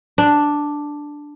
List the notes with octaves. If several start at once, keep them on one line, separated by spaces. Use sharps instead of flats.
D4